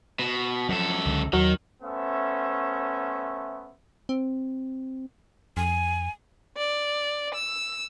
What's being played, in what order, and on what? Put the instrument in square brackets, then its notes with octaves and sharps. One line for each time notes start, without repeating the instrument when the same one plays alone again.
[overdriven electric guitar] B2
[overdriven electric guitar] F#2 A4 [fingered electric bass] F3 F#3
[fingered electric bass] C#2 D3 G#3
[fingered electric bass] D#2 [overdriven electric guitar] D#3 [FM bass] F#3
[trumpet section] A3 B3 C#4 C5 E5
[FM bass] C4
[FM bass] F2 [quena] G#5
[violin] D5
E6